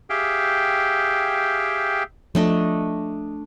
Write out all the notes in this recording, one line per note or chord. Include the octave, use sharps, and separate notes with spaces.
G4 G#4 E5 F5 G5
F3 A3 D4 D#5